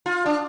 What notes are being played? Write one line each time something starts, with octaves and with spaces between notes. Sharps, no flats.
F4
D4